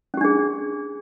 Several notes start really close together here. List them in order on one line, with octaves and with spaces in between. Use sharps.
C#4 G4 D4 G#4